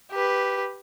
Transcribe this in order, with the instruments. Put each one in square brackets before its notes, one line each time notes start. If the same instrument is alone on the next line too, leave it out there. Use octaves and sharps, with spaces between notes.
[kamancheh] G4 B4